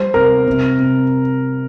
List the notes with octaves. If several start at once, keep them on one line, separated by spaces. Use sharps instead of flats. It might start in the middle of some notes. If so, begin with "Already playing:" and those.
Already playing: G3 C5
C3 A#4
C3
C3